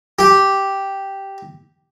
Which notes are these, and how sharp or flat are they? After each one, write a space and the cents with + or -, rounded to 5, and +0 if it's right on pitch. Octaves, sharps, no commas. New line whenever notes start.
G4 -5